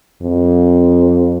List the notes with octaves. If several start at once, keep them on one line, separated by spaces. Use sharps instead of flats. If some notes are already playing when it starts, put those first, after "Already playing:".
F2